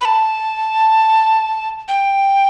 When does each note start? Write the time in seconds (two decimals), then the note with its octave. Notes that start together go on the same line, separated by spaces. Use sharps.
0.01 B5
0.05 A5
1.88 G5